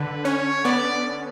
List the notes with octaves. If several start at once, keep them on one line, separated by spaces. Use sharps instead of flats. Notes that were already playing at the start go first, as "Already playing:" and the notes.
Already playing: D3 B4
C#4 C#5
B3 D5